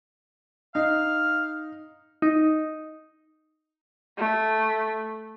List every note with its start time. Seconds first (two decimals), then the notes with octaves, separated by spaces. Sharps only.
0.75 D#4 F5
2.22 D#4
4.18 A3